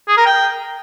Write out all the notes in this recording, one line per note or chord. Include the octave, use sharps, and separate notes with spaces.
G#4
A#4
G5